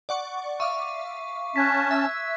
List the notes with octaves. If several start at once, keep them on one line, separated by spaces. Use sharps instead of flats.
D5 F#5 C#6
E5 F5 C#6 D6
C#4 A5 F#6 G#6 B6
E5 E6